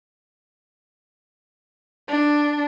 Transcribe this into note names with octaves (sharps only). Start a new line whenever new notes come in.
D4